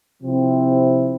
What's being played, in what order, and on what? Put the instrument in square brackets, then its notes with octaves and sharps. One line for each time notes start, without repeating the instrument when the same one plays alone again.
[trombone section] C3 F3 C4 E4